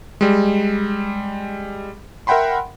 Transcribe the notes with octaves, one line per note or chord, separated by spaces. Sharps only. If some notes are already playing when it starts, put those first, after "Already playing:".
G3 G#3
A#4 E5 F#5 G5 B5 C6